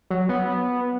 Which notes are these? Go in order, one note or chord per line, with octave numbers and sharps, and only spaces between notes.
F#3
B3